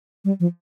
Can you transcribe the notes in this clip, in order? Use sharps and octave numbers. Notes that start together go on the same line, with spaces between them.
G3
F3